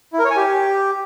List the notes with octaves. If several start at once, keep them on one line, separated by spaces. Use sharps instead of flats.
E4
A#4
C#5
G#5
G4